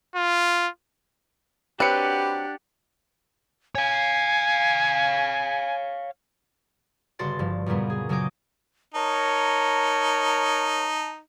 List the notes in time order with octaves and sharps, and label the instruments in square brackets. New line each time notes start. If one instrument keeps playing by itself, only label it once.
[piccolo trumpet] F4
[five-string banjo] F#3 C4 [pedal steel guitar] D4 F#5 [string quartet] G4 [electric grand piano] B4 C#7
[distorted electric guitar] C#5 F5 [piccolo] G#5
[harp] G1 C#3 F#4 D5 C6 A6
G2 F3
F#2 A#2 C#3 G3 B3
G#4
C#3 F#3 G#4 D#5 D6 G6
[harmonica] D#4 [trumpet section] A#4 C#5 [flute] A5